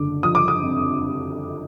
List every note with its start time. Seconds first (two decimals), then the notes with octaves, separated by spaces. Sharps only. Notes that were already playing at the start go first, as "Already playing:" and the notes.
Already playing: F#1 D3 D6
0.23 F3 D#6
0.35 D6
0.48 D#6
0.63 F2